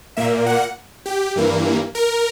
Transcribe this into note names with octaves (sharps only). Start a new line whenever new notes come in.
A#2 A#3 E5
F#5
G4
G2 E3 A#3
A#4